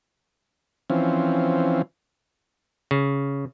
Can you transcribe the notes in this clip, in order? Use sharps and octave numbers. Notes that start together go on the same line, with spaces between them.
E3 F3 C4 C#4
C#3